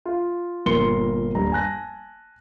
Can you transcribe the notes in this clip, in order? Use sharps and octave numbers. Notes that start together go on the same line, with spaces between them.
F4
G1 A#2 A#4 C6 C#7 G7
D#1 G2 A#5
G#5 A5 F#6 A#6